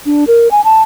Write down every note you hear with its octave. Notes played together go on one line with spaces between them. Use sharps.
D4
A#4
G#5
A5